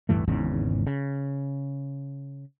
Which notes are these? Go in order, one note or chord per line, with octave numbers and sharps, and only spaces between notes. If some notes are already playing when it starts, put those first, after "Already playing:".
D1 G2 E3 A3
G#1 E2 G#2 C#3
C#3